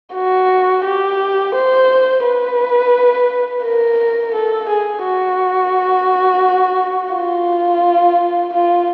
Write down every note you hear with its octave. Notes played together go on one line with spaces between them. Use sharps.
F#4
G4
C5
B4
A#4
A4
G#4
F#4
F4
F4